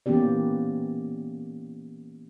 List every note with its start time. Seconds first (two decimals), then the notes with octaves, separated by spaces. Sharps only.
0.06 E3 A#3 B3 C#4 G4 D5